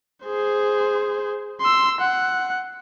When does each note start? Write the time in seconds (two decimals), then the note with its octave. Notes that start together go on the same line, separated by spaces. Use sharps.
0.25 G#4 C5
1.61 C6 E6
2.01 F#5